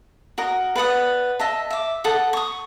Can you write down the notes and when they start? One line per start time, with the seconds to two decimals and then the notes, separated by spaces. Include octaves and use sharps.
0.38 F#4 A#4 D#5
0.76 B4 D5 F#5 D#6
1.40 D#5 E5 A5
1.71 E5 D6
2.04 A4 F#5 D#6
2.33 C#6 D#6